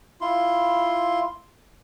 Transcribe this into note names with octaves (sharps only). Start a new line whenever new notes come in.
E4 F4 C6